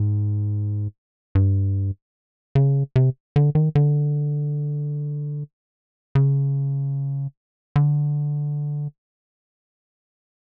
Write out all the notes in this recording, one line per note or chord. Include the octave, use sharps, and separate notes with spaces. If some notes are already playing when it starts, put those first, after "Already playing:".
Already playing: G#2
G2
C#3
C3
D3
D#3
D3
C#3
D3